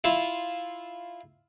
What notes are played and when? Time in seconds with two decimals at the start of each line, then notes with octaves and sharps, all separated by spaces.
0.04 E4 F4 E5